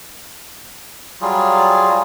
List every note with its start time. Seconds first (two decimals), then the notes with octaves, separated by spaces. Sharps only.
1.21 F#3 G3 F4 G#4